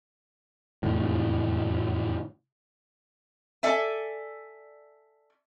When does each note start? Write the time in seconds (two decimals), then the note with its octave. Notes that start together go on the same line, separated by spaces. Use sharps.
0.83 F1 E2 A2
3.63 A4 D5 E5 G#5